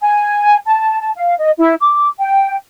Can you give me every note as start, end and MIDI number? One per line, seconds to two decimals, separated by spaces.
0.01 0.57 80
0.66 0.99 81
1.01 1.10 81
1.16 1.34 77
1.39 1.51 75
1.59 1.74 64
1.81 2.08 86
2.19 2.56 79